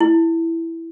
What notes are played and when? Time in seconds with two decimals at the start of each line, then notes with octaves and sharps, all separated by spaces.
0.01 E4